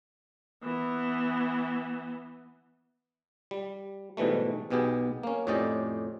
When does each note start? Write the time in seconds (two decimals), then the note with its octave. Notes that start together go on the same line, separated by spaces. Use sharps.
0.63 E3 B3
3.51 G3
4.17 G#2 B2 E3 G3 A3
4.70 B1 B2 B3 G4 G#4
5.23 A#3 C#4
5.47 F2 A2 C#4 G4 D5 D#5